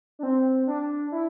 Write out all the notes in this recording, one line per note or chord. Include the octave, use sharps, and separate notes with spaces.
D4
C4
D4
E4